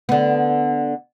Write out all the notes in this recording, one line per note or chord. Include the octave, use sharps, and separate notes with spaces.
D3 B3